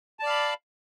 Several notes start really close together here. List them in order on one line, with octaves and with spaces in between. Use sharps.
A5 D5 F5 B5